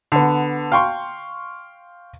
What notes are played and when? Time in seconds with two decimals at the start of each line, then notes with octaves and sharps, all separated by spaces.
0.12 D3 B3
0.72 F5 G5 C6 C#6